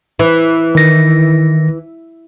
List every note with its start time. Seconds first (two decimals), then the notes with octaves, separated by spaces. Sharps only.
0.19 E3
0.75 D#3 A#6